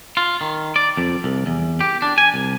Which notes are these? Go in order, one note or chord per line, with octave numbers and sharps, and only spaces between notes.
F4
D#3
D5
F2
C2
E2
G4
D4
G#5
C2